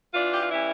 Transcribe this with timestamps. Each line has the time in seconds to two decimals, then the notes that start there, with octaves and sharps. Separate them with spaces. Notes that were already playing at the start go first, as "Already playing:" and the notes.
0.13 E3 D4 F4
0.33 G4
0.42 F4
0.51 G3 C#4 E4